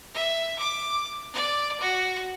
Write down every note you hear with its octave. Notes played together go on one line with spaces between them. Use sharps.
E5
D6
D5
F#4